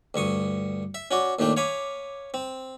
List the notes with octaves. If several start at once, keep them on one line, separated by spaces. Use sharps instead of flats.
D2 G2 C#6 D#6
E5
C#4 F#4 D5
D#2 A#2 A3 D4 G5
C#5 F5 G#5 B5 D6
C4